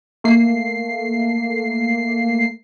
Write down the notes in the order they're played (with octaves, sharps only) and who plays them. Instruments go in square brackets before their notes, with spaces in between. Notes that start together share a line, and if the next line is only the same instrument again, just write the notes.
[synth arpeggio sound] A3 A#3 C7